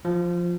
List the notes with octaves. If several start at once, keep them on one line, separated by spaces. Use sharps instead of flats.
F3